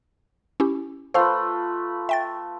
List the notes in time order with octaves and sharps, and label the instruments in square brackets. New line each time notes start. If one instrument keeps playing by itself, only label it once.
[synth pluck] C#4 E4 G4
[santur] A3 F4 B4 [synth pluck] C5 F5 C6
[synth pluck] E5 G5 A6